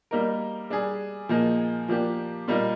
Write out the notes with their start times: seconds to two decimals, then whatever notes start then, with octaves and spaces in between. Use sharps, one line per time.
0.11 G3 A#3 D#4 A#4
0.70 G3 D4 G#4
1.29 A#2 F3 A#3 D#4 G#4
1.88 F3 A#3 D4 G4
2.48 A#2 G3 A#3 D#4